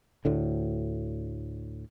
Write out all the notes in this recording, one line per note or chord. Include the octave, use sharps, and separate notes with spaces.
D2 A2 D3